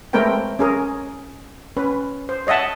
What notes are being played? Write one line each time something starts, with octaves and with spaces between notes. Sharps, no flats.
G#3 A3 C4 A#4 B4 G5
C#4 G#4 A#4
C#4 B4
C5
C#5 D#5 E5 F#5 A5